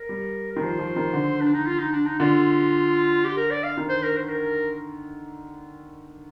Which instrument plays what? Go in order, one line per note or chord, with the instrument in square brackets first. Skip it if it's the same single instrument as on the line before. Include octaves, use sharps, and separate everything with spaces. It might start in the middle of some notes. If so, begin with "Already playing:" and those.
Already playing: [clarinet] A#4
[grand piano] G3
[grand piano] D#3 [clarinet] A#4
[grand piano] F3 [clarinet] C5
[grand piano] F3
D#3
D3
[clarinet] D4
D#4
F4
D#4
D4
D#4
[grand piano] D3 [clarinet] F4
[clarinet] G4
A#4
D5
F5
[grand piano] D#3
[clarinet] C5
A#4
C5
A#4